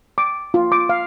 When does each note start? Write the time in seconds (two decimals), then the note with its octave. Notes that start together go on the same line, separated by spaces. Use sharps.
0.18 D6
0.54 F4
0.72 D6
0.89 F5